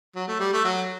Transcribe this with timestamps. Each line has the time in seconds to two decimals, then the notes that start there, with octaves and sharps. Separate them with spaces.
0.15 F#3
0.28 A3
0.40 G3
0.53 A3
0.64 F#3